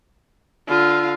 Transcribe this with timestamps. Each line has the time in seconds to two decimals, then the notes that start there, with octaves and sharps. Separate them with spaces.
0.68 D3 F4 F5